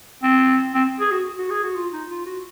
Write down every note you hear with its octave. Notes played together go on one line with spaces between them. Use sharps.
C4
C4
G#4
F#4
F#4
G#4
F#4
F4
D#4
F4
F#4